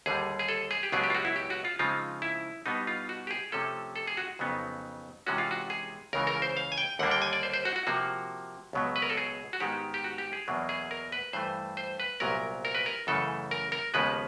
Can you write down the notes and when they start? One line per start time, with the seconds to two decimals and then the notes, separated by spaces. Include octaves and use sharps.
0.06 D#2 D3 G3 G#4
0.39 G#4
0.48 A4
0.71 G#4
0.83 G4
0.92 C#2 B2 F#3 B3 D4 G#4
1.04 G4
1.10 F4
1.15 F#4
1.25 E4
1.36 G4
1.50 F#4
1.65 F4
1.79 C#3 F3 G#3 C4 D#4 F4
2.22 E4
2.66 B2 G3 B3 D#4
2.87 F4
3.09 F#4
3.27 G4
3.31 G#4
3.52 C3 F3 A3 C#4 A4
3.96 A4
4.07 G#4
4.17 F#4
4.39 F2 C#3 F#3 B3 D#4
5.27 C3 E3 G#3 C#4 F#4
5.38 F4
5.51 F#4
5.70 G#4
6.13 C#2 C#3 E3 A#4
6.27 A#4
6.42 C5
6.57 F5
6.72 G#5
6.78 G5
6.99 D#2 D3 G3 A#3 D4 F#5
7.11 G5
7.22 G#5
7.33 D5
7.43 C5
7.54 C5
7.65 F#4
7.76 F#4
7.87 C3 F3 A#3 F#4
8.73 C#2 B2 F#3 B3
8.96 B4
9.02 A#4
9.10 A4
9.17 G#4
9.53 F#4
9.60 G#2 D#3 G#3 B3 G4
9.94 G4
10.04 F#4
10.18 G4
10.33 G#4
10.47 E2 B2 F#3 A#3 D4
10.69 G#4
10.91 A#4
11.12 B4
11.33 G2 E3 A3 C5
11.77 C5
12.00 B4
12.20 C2 A#2 F#3 B3 A#4
12.65 A#4
12.75 B4
12.86 A#4
13.07 F#2 C#3 E3 A3 A4
13.51 A#4
13.72 A#4
13.94 D#2 C#3 F3 G#3 B3 B4